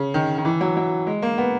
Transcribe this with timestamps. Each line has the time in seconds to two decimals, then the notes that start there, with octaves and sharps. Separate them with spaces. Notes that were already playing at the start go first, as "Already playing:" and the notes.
Already playing: C#3
0.14 D#3
0.38 D#3
0.45 E3
0.61 F#3
0.77 F#3
1.07 G#3
1.22 A#3
1.38 B3